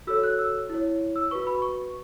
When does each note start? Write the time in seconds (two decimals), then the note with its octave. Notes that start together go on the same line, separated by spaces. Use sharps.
0.07 F#4 A4 C#5 E6
0.23 F#6
0.39 E6
0.70 E4 C#5
1.16 E6
1.31 F#4 B4 C#6
1.47 B5
1.62 C#6